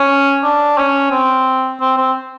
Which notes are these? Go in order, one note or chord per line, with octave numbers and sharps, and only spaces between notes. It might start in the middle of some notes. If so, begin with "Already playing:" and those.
Already playing: C#4
D4
C#4
C4
C4
C4